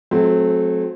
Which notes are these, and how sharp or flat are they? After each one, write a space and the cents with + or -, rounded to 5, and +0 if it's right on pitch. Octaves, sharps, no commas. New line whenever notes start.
F#3 -30 A3 -35 C4 +0